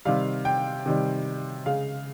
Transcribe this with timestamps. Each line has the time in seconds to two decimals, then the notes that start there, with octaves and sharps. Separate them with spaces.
0.05 C3 D#3 G3 F5
0.45 G5
0.86 C3 D#3 G3
1.66 C#3 G#3 F5